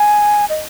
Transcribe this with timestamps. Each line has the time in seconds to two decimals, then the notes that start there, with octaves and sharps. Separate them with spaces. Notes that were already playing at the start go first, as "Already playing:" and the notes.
Already playing: G#5
0.49 D#5